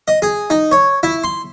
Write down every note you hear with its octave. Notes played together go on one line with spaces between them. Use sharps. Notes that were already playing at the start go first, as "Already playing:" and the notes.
D#5
G#4
D#4
C#5
E4
C6